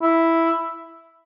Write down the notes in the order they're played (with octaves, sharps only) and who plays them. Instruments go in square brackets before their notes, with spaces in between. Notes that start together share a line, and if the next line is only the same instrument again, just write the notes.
[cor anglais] E4